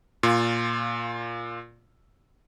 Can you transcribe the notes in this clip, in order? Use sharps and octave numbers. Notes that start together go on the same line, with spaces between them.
A#2 F4